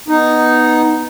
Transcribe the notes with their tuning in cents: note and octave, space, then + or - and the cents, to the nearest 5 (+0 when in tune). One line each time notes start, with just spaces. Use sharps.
B3 +0 D#4 +0